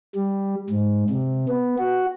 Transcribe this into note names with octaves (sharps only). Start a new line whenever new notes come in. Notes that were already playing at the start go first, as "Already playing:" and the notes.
G3
G#2
C3
B3
F#4